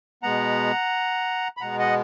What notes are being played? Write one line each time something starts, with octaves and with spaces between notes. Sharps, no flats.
B2 G#3 B3 F#5 A#5
B5
B2 G#3 B3 F#5 A#5
D#5 F#5